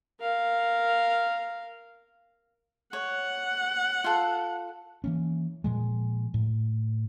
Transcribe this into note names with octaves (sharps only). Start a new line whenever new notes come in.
A#4 F5
C#5 F#5
F4 A4
E3 A#3 C#4
A#2 F3 G#3
A2